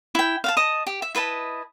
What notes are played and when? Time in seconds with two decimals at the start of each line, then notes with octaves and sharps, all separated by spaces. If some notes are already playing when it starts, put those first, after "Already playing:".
0.15 E4 G5
0.44 F5 F#5 A5
0.57 D#5 A5 D#6
0.87 G4
1.02 E5
1.15 E4 B4 D#5 A5